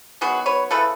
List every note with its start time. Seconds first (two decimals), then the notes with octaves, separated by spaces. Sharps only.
0.21 D#3 F#3 B3 F#4 G#4
0.46 B4 C#5
0.71 C#3 E3 A3 A4 B4